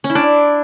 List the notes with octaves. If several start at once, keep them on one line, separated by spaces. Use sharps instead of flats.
C#4
E4
D4